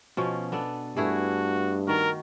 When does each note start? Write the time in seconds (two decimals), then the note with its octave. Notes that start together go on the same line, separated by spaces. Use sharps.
0.17 B2 F3 C#4
0.52 B3 D4 A4
0.97 G2 A3 E4 F#4 G#4
1.87 D#3 F#4 A#4